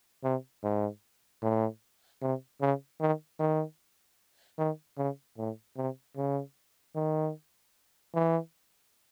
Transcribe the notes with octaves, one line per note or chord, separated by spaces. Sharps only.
C3
G#2
A2
C3
C#3
D#3
D#3
D#3
C#3
A2
C3
C#3
D#3
E3